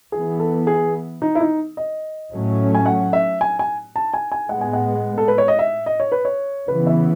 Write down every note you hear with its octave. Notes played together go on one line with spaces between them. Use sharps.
E3 B3 G#4
A4
G#4
D#4
E4
D#4
D#5
A2 F#3 A3 C#4
G#5
F#5
E5
G#5
G#5
A5
G#5
G#5
A2 G#3 B3 F#5
G#5
F#5
A4
B4
C#5
D#5
E5
D#5
C#5
B4
C#5
C#3 E3 B3 B4
E5